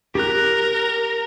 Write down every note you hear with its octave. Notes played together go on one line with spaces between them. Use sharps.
G4 A#4 F#6